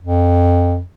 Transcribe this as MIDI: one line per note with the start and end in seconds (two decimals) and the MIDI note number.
0.01 0.82 41